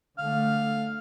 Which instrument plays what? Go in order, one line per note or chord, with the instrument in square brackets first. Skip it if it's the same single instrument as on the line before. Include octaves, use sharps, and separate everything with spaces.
[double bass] D3 A3 [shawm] F5